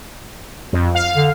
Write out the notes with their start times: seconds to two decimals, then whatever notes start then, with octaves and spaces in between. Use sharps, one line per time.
0.73 F2
0.95 F5
1.15 D3